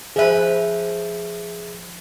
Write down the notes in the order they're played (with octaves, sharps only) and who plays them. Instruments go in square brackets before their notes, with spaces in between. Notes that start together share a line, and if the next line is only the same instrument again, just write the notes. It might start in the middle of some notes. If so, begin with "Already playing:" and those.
[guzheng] F3 B4 [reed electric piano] G#4 E5